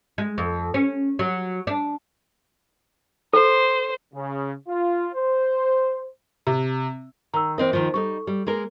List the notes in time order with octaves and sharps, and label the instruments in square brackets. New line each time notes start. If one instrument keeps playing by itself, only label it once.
[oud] G#3
F2
C#4
F#3
D4
[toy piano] A4 [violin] C5
[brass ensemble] C#3
F4
C5
[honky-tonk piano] C3
[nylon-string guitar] D#3 [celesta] A#5 E6
[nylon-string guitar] E3 C4 D#5 [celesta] A#4 C5
[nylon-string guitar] D#2 D#3 F3
[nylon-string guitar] G3 D#4 [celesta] A4 C#6
[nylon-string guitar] G3
G#3 A#3 A#4